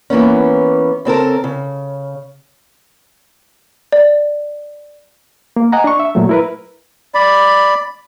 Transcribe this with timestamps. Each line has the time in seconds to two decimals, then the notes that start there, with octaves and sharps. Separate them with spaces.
0.10 E3 A#3 B3 C#4
1.05 C#3 C4 A4 A#4
1.44 C#3
3.92 D5
5.56 A#3
5.72 D#5 F#5 G#5 A#5
5.84 D4 C#6
6.00 E5
6.15 A#2 F#3 A3
6.29 E4 A#4 B4
7.14 D5 B5